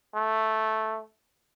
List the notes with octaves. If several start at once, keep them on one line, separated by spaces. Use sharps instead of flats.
A3